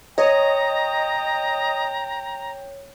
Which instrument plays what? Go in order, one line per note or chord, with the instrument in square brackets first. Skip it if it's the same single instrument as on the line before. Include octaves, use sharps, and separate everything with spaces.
[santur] C#5 [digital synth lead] D#5 [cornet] G5 [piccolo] A#5